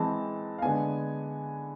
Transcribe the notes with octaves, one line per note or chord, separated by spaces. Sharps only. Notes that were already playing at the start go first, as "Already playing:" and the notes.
Already playing: E3 G#3 C4 A5
F5
D3 G#3 B3 G#5